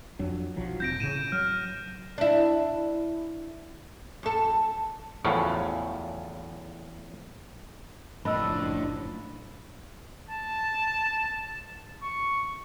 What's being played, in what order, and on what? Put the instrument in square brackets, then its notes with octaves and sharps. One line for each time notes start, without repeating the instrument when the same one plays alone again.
[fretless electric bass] F2 F#3 D4
B1 F3 F#3
[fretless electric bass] F1 C4 [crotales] G6 A#6 D7
[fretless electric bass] A2 C#3 [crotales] D#7 E7
[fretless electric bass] F#3 [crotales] F6
[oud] D4 E4
F#2 A4
[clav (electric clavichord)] E2 A2 C#3 F3 F#3
[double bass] F#1 F2 [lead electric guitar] A2 [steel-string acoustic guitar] D4 D#5 [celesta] B5 E6
[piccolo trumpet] A5
C#6